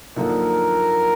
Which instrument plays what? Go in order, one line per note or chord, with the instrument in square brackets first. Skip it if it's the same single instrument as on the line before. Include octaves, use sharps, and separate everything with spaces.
[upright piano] F#2 D3 F3 A#3 D#4 [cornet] A#4